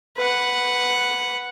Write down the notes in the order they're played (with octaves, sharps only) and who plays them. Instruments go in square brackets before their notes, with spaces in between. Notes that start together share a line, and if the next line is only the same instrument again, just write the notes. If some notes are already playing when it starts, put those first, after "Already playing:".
[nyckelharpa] B4 F#5